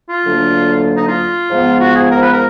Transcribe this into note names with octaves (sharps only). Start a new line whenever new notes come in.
F4
D2 D3 F#3 A#3
D#4
F4
G#2 F3 G#3 B3
F#4
G#4
A#4
B4
A#4